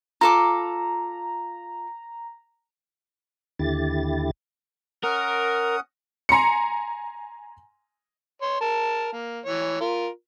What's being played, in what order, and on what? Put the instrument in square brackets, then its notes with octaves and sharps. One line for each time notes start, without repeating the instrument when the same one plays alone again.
[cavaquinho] F4 A4 D6 [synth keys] A#5
[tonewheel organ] D#2 D3 E4 G4 A6
[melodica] C#4 F#5 D#6 [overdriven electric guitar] A#4
[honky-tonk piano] G#5 A#5 C6 C#7
[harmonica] C#5 C6
A#4 A5
A#3
E3 C#5
F4 A#4